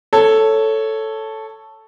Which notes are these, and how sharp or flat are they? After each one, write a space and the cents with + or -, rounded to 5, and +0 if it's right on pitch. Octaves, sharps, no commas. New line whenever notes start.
A4 +0 C#5 +0